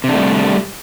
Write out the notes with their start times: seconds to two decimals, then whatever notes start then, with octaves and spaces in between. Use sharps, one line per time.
0.04 C3
0.09 D4
0.13 A3
0.18 G3